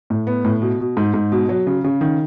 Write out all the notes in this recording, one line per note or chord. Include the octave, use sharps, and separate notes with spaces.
A2
B3
A2
B2
B2
G#2
G#2
B2
F#3
C#3
C#3
D#3